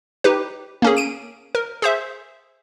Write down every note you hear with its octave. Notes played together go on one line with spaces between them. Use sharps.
D#4 G4 B4
A#3 C#4 G#4
D7 D#7
A#4
G#4 C5 E5